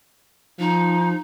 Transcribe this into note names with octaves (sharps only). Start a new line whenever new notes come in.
F3 D#4